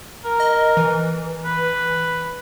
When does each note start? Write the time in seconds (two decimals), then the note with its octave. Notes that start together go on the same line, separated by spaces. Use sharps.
0.25 A#4
0.40 D#5
0.77 E3
1.44 B4